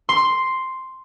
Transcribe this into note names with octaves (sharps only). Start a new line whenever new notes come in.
C6